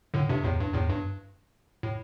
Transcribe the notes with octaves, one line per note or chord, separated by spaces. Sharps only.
A2 D3
G2 C3
E2 A2
G2
E2 A2
G2
A2